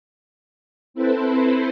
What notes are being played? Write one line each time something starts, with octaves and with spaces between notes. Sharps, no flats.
C4 E4 A4 B4 C5